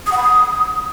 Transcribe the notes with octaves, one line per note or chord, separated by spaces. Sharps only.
D#6
F#5
B5
D#6